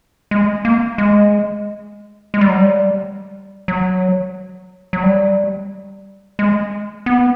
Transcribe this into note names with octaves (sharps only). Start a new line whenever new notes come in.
G#3
A#3
G#3
G#3
G3
F#3
G3
F#3
F#3
G3
G#3
B3